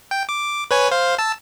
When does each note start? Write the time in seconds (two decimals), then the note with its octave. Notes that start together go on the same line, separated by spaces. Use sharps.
0.11 G5
0.29 D6
0.71 B4 C#5 G#5
0.91 C5 F5
1.18 A5 E6